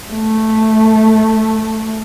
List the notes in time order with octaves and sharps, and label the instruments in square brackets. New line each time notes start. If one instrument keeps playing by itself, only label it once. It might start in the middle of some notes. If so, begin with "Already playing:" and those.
[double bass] A3